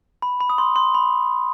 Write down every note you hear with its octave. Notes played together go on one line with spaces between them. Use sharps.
B5
B5
D#6
C6
C6
B5